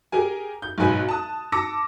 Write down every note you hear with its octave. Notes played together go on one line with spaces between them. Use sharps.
G4 G#4 A#4 G#5
G6
B1 G#2 B2 B4 G#5 F#6
A5 D#6
A5 D6 E6 A#6 C#7